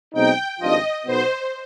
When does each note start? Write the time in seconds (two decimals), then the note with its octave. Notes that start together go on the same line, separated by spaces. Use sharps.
0.14 B1 B2 G#3 C4 D#4 G5
0.60 G#1 G2 F3 D#5
1.05 B1 B2 B3 C5